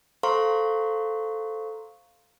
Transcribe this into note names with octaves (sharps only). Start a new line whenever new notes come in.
A4 C5 F5 A#5 C6 C#6